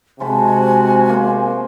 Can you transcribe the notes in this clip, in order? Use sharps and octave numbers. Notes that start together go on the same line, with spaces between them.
C3 G#3 F#4 C5 G#5 A5 B5
A#3 C5